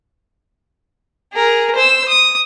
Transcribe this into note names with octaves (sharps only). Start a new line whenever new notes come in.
G#4 A#4
C5 E6
D#6